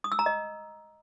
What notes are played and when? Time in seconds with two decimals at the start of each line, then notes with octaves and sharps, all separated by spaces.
0.04 D#6
0.12 E6
0.19 A#5
0.26 D#5